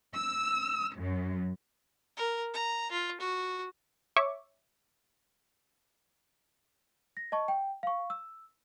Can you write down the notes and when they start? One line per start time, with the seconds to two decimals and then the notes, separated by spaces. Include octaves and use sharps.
0.14 E6
0.96 F#2
2.17 A#4
2.54 A#5
2.92 F4
3.20 F#4
4.17 C#5 E5 C#6 D6
7.17 A#6
7.32 D#5 A5 C#6
7.48 G5
7.83 F5 C#6
8.10 E6